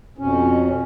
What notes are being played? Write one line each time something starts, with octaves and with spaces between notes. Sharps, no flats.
F2 B2 C#4